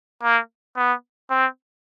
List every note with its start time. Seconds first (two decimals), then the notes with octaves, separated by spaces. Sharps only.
0.23 A#3
0.77 B3
1.30 C4